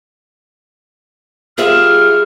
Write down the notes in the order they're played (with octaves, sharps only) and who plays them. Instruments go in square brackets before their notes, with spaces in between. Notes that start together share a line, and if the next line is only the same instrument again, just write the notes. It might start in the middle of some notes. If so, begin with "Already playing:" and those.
[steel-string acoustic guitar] G3 F4 E5 [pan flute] G#4 [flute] F6